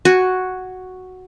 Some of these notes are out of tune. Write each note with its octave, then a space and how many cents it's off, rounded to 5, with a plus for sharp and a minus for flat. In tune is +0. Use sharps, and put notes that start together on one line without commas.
F#4 +0 G#5 +0